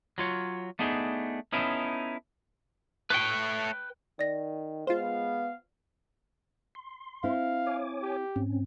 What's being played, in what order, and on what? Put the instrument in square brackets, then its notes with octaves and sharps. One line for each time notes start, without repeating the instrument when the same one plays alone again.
[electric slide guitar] F#3 F4 C#5
A3 B3 D4 D#4 G#4
B3 C#4 D#4 E4 A4
[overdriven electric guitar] A3 C#5 [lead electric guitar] B4 G5
[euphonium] D#3 [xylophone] D5 A#6
[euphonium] G#3 [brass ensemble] B3 F5 [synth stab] F4 C5
[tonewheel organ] C6
[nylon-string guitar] C4 E4 [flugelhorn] F5
[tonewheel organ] C#5 G#5 D6
[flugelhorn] G4
[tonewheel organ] G#2 C4 C#4